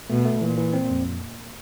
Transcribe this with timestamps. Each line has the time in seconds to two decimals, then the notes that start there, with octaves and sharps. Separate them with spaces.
0.10 B2 A3
0.25 A3
0.41 A#2 E3
0.57 E3
0.74 C4
0.90 F2